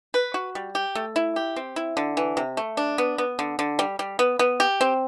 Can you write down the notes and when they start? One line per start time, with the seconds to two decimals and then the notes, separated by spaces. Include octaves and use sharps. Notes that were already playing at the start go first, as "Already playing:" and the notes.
0.14 B4
0.34 F#4
0.55 G3
0.75 G4
0.95 A3
1.16 E4
1.36 G4
1.56 C4
1.76 E4
1.97 D3
2.17 E3
2.37 C3
2.57 A3
2.77 D4
2.98 B3
3.18 B3
3.39 D3
3.59 D3
3.79 G3
3.99 G3
4.19 B3
4.39 B3
4.60 G4
4.81 C4